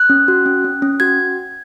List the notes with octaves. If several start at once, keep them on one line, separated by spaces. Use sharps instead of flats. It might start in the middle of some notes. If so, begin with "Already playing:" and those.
Already playing: F#6
C#4
F#4
C#4
C#4
C#4
F#4 G#6